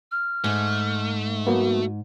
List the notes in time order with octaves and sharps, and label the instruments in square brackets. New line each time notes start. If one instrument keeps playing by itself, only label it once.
[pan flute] F6
[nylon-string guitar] G#2 [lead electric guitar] A3
[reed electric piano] F#3 A#3 B3 [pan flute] F#4